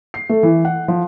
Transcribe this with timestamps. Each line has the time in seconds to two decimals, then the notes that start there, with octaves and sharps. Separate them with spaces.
0.14 C7
0.29 A3
0.43 E3
0.65 F#5
0.88 F3